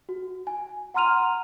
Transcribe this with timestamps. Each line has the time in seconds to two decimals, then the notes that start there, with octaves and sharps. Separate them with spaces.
0.09 F#4
0.47 G#5
0.94 F#5 A#5 C6 F6 D#7 F7